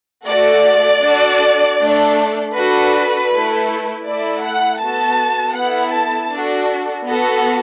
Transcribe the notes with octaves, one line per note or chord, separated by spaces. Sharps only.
A3 F#4 A4 D5
D4 F#4 A4
A3 D4 A4
D4 F#4 A4 B4
A3 E4 A4
A3 E4 A4 D5
F#5
B3 F#4 A4 A5
B3 E4 A4 F#5
A5
D4 F#4 A4
B3 F#4 A4